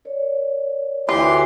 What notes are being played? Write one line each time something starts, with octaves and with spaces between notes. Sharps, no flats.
A#4 C#5 D5
D2 E3 F4 G4 C6